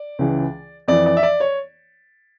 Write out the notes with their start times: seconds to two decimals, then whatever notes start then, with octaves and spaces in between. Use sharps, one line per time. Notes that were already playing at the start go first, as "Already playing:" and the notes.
Already playing: D5
0.19 C#2 C#3 E3
0.88 F2 E3 D5
1.06 D5
1.17 E5
1.23 D5
1.40 C#5